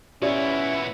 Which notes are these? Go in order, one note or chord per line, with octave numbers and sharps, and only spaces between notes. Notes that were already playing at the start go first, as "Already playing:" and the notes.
A#2 B3 C#4 E4 G4 D5 E5